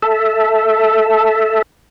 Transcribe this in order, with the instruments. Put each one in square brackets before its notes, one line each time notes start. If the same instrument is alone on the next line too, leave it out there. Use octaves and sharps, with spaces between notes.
[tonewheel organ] A4 E5